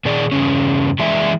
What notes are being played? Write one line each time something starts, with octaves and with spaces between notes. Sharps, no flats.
A#2 D#3 G#4 D5
E2 G2 A#2 C#3 C#4
E3 G#3 D5 E5 G#5